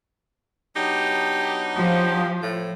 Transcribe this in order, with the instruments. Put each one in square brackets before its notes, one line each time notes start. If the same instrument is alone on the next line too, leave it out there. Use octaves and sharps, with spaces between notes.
[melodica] F#3 B3 D4 [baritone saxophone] D#4 [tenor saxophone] G4
[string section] F3 [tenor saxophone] G4
[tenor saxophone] A2